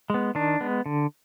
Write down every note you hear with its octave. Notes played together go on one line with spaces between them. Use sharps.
G#3 B3
D#3 D4
G#3 B3
D3